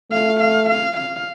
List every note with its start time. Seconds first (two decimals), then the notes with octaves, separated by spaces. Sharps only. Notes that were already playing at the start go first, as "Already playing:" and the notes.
0.12 A3 F5
0.40 F5
0.69 F5
0.97 F5